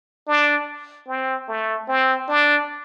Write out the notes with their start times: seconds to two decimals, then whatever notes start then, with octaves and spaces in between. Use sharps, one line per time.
0.28 D4
1.08 C4
1.48 A3
1.89 C4
2.29 D4